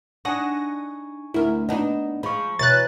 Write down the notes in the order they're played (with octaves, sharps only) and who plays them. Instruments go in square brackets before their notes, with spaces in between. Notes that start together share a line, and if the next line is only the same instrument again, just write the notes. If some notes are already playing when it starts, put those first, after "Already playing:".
[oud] D4 [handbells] D#4 G#5 C#6 [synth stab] F#5 D#6 A#6
[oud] D2 A#4 [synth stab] E4
[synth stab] A#2 D#4 [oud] B3 D4 [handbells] D#5
[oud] F3 G#3 [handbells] B5 C#6
[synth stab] B2 C#5 [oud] E3 [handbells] B4 A#5 [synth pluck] F#6 A6